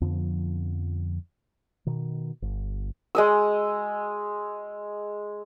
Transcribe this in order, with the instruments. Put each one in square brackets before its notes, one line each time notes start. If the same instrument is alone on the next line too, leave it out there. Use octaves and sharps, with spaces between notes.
[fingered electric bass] F2 D3 F3 B3
B2 D#3
G1
[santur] G#3 D#5 E6